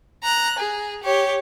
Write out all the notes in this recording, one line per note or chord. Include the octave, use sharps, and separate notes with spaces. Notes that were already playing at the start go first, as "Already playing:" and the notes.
A#5 F#6
G#4
G4 C#5